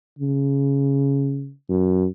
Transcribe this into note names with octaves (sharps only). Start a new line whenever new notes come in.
C#3
F#2